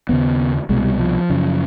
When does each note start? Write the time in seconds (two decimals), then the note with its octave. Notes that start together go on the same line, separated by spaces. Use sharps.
0.09 D#2 C#3 B3
0.69 C2 B2 G#3
0.84 G3
1.00 F3
1.30 F#2 C#3